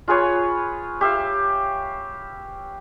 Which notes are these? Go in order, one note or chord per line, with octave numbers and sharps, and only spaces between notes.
F4 G#4 B4 C#5
G4 E5 F5